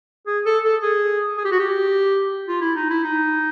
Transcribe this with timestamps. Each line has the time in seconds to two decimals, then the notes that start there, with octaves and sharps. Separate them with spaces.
0.27 G#4
0.46 A4
0.64 A4
0.82 G#4
1.37 G#4
1.45 G4
1.51 F#4
1.59 G4
2.48 F4
2.61 E4
2.76 D#4
2.90 E4
3.04 D#4